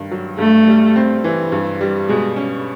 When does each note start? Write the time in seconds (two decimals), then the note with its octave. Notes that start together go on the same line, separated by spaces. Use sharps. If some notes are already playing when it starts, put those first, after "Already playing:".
Already playing: G2 D#3
0.11 F#3
0.39 G2 A3
0.68 G3
0.96 C4
1.24 E3
1.52 G2
1.81 G3
2.08 B2 G#3
2.36 C#4